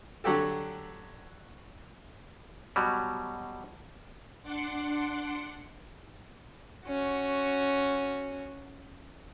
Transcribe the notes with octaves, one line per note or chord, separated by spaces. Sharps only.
D3 F#3 F#4 G4 A4
B2 F#3 G3
D4 F#5 C6 D6 C#7
C#4 F#4